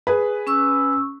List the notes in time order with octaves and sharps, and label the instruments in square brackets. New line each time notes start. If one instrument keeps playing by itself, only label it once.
[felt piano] G#4 B4
[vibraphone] C#4 C#6 E6